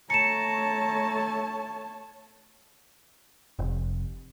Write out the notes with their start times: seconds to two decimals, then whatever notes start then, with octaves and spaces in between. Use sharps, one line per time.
0.10 A3 C#5 A5 A#5 C#7 E7
3.59 F1